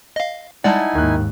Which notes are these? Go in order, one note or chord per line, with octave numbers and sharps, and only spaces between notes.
D#5 F5
G3 G#3 D#4 E4 D5 F#5 G#5 A5
D#2 G#2 D#3 F#6